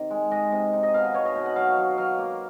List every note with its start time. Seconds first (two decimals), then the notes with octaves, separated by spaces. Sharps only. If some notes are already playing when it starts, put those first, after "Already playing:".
Already playing: C3 D#3
0.10 G#3
0.31 G#3 D#5
0.52 C3
0.73 D#4
0.83 D#5
0.94 B2 F5
1.04 D#5
1.14 B2 C#5
1.25 D#5
1.35 B2
1.46 F#5
1.56 F#3 F5
1.77 F#3
1.98 F#3 F5
2.18 A#3